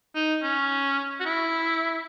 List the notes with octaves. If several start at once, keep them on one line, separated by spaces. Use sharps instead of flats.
D#4
C#4
F#4
E4